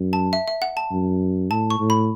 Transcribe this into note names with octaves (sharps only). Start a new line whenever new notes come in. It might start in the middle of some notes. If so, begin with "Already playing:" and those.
Already playing: F#2
A5
E5
E5
F#5
A5
F#2
A2 A5
C#6
A2
B5